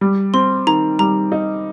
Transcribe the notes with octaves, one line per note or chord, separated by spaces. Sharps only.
G3
C4 C6
D#3 A#5
G3 A#5
D#4